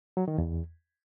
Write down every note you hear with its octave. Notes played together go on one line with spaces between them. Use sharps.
F#3
D#3
E2